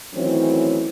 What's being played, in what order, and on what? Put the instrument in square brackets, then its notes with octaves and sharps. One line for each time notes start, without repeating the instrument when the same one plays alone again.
[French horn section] D#3 E3 F#3 A3 C4 C#4